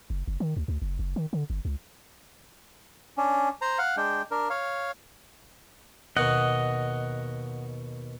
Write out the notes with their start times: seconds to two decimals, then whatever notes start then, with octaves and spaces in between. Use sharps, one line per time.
0.10 F#1
0.28 F#1
0.40 D#3
0.57 D2
0.68 D2
0.82 F#1
0.99 F#1
1.16 D#3
1.33 D3
1.50 G1
1.65 C#2
3.18 C#4 D4
3.62 C5 A#5
3.78 F5 F#5
3.97 G#3 D4 G5
4.31 D4 A#4
4.50 C#5 F5
6.17 D#2 B2 D#5 F#5